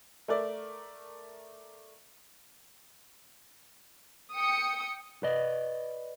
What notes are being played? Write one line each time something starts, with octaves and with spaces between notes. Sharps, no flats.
A3 A#4 D5 E5
G5 D#6 C#7
B4 D5 D#5